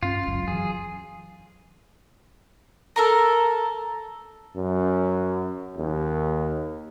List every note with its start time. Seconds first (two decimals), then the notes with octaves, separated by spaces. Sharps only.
0.03 G2 C#4 F4
0.27 F#1 C#2 F#2
0.48 E3 F#3 G#4
2.96 A4 A#4 A#5
4.56 F#2
5.78 D#2